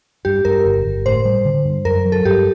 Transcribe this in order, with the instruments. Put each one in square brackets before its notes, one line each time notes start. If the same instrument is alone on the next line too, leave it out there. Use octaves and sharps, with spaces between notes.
[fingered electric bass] G2 [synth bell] G4
[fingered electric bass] G2 [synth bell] A#4
[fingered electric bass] G1
G1
[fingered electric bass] A2 [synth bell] C5
[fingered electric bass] G3
D3
G2
[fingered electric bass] F#2 [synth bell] A#4
[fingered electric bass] F#3
[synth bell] A4
[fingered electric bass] G2 [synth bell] G4